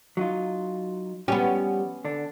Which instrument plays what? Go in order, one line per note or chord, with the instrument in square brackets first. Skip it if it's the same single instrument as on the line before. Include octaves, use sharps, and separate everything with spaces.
[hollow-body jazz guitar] F#3 D#4 F4
[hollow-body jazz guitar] F3 G3 G4 [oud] B3 C#4
[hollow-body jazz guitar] D3 D4